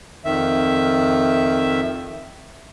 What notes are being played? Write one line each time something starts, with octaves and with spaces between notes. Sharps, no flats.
F2 D#3 E5